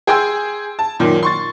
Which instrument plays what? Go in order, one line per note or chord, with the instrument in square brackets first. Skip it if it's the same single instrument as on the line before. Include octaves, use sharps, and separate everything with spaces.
[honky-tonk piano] G#4 G5 G#5 C6 E6 G#6
A5
F#2 A#2 D#3
C6 C#6 A6